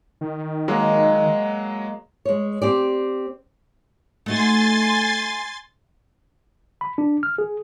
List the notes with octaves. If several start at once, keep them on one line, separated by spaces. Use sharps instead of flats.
D#3
F#3 G#3 A#3 D#5
G#3 C#5
C4 G4 D5
A3 D#4 F#4 G#5 C6 A6
B5
D4
F6
G#4